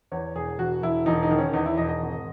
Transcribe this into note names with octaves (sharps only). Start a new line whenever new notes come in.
E2 C#5
E1 G#4
E1 F#4
E1 E4
E1 D#4
D#4
D#3
C#4
E2 D#4
E4
E1 D#5
D#5
G#1